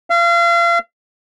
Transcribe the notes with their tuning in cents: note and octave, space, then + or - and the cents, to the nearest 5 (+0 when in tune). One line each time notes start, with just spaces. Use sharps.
F5 -35